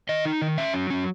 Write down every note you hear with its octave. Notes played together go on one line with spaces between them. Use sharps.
D#3 D#5
D#4
D#3
C#4 E5
F#3
C#4